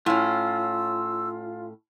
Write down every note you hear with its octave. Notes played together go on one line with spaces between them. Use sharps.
A2 C#4 F4 E6